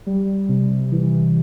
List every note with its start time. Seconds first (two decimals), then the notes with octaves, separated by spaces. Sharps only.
0.07 G3
0.49 C3
0.92 E3